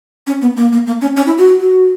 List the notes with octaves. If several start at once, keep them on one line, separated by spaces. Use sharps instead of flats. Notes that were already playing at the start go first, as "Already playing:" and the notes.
C#4
B3
A#3
A#3
A#3
C#4
C#4
E4
F#4
F#4